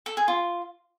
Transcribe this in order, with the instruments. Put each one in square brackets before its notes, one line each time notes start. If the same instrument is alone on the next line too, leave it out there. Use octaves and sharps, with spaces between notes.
[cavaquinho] A4
G#4
F4